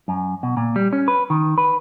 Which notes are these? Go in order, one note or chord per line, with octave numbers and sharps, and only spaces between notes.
F#2
B2
A#2
G3
C#4
B4
D#3
B4